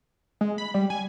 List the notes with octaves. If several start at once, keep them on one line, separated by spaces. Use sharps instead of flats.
G#3
B5
G3
G#5